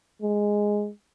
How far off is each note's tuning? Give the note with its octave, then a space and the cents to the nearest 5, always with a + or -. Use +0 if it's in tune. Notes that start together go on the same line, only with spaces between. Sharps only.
G#3 -5